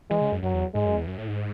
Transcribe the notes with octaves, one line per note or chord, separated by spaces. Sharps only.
E3 G#3
C#3
F#2
F#2 F#3
E2
G#2 G#3
F#2
E2
F#2
A2
G#2